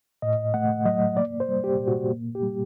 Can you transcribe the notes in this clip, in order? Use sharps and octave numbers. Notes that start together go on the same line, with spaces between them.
A2 D#5
A3 F#5
F#3 D#5
A#3 D5
C5
G3
G4
A#2
F#4
A#3
G4
G3